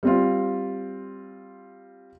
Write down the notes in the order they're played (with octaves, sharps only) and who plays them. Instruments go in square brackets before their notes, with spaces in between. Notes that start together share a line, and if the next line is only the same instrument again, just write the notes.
[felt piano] G3 C4 F4